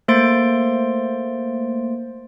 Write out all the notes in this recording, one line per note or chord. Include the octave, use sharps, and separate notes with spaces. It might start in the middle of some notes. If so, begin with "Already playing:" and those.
A3 A#3 C5 C6 A6 D7